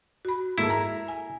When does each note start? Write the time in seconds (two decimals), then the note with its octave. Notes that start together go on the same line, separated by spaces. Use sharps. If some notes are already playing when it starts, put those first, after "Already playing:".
0.25 F#4 B5
0.58 G#2 A#3 E4 A4
0.70 A#5
1.08 G#5